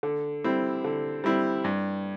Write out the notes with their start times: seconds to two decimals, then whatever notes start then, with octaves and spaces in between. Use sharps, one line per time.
0.03 D3
0.44 G3 C4 E4
0.84 D3
1.24 G3 C4 E4
1.64 G2